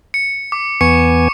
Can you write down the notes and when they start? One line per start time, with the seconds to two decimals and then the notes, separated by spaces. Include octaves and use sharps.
0.14 C#7
0.52 D6
0.81 E2 B3 G#5 C#6 C#7